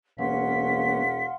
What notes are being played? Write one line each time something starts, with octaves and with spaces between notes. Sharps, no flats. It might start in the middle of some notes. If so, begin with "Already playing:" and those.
E1 E3 A#3 C#4 F5 F#5 C6 B6